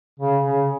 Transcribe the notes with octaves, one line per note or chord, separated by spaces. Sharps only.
C#3
C#3